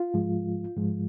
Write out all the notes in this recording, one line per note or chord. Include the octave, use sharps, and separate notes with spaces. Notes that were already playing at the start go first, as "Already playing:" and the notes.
Already playing: F4
G#2 F3 G#3
G#2 F3 G#3